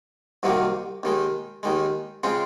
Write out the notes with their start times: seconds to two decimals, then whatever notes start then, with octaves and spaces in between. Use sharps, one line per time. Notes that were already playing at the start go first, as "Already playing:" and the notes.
0.43 C2 C3 D#3 F#3 A#3
1.03 D#2 D#3 G#3
1.63 D#2 D#3 G#3
2.23 C#3 G#3 C4 F4